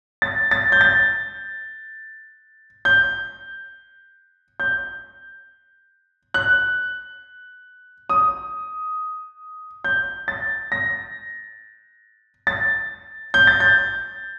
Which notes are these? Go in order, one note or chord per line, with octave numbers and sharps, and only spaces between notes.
A6
A6
G6
A6
G6
G6
F#6
D#6
G6
A6
A#6
A6
G6
A6
G6